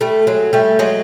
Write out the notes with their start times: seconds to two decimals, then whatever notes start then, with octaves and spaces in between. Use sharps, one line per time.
0.01 G3 A3
0.27 F#3 G#3
0.53 G3 A3
0.79 F#3 G#3